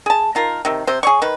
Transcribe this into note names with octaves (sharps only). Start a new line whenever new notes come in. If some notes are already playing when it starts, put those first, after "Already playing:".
G#4 A5
D#4 F4 A#4
C3 D#3
C3 C5
G#4 C#5 C#6
D#3 B4